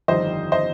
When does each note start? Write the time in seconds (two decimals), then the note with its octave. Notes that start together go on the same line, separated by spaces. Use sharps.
0.08 G1 F2 D#3 G3 C5 D#5
0.52 C5 D#5